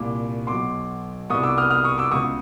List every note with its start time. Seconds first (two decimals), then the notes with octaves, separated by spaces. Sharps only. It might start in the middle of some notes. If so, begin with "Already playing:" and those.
Already playing: C2 A#2 D6
0.47 B1 B2 C6 D6
1.30 C2 B2 C#6 D#6
1.43 D6 E6
1.57 D#6 F6
1.70 D#6 F6
1.84 C#6 D#6
1.98 D6 E6
2.11 C#2 B2 C#6 D#6